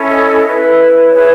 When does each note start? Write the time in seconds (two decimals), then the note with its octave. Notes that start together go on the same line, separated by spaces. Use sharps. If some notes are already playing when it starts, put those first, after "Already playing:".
Already playing: C#4 E4 A4
0.10 D#5
0.26 D#5
0.44 E4 B4
1.11 E4 G#4 B4 C#5